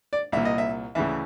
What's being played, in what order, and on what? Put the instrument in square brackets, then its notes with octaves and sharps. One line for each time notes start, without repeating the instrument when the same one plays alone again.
[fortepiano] D5
C2 A#2 E5
D#5
E5
D2 C#3 E3 E5